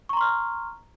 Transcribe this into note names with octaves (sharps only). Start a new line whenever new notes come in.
A#5 C6 C#6 F6